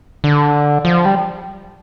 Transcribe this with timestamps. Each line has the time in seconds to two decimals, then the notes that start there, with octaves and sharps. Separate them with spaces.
0.24 D3
0.85 F3
1.05 G3